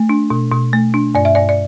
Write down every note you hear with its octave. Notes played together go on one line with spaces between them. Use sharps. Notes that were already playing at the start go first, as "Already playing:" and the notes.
Already playing: A3
D4
B2
B2
A3
D4
G2 D5
E5
G2 D5
D5